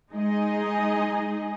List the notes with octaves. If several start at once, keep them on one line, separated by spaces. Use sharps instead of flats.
G#3 D#4 G#4 D#5